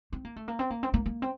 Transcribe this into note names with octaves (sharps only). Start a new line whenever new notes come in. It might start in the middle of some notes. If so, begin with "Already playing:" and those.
C4
A#3
A3
A#3
C4
A#3
C4
A#3
A#3
C4